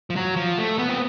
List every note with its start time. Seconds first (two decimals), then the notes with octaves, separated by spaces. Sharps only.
0.10 F3
0.16 F#3
0.36 F3
0.58 A3
0.78 B3
0.89 C4